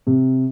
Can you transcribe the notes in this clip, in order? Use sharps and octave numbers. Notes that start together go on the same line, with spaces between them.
C3